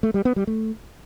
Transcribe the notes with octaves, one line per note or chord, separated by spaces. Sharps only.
A3
G3
B3
G3
A3